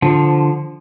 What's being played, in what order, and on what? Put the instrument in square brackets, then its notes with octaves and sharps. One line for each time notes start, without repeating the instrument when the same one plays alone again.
[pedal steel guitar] D3 F3